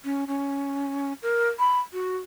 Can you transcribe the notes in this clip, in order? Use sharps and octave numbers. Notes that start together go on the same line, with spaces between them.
C#4
C#4
A#4
B5
F#4